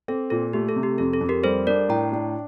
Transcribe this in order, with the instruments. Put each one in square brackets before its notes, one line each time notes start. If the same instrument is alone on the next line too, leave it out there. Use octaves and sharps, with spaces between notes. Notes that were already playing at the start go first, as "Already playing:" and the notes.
[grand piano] C4 [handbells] A4
[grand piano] A#2 [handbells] A4
[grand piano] A3 [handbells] G4
[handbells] A4
[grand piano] C3
[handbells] G4
[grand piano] F2 [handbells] A4
[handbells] A4
[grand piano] F2
[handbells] G4 A#4
[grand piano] G3 [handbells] A4 C5
[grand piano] D4 [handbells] A#4 D5
[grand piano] A2 [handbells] G5 A#5
[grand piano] D4